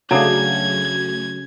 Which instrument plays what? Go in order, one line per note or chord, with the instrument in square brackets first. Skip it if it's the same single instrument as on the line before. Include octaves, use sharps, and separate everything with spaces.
[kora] C#3 [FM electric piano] F#3 A3 [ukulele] D4 G#4 A#5 [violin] G#6